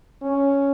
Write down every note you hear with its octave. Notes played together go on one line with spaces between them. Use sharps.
C#4